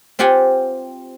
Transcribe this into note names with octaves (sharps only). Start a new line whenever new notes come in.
C4 F4 G4 F#5 G#5